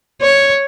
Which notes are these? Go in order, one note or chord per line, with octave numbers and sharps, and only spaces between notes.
C#5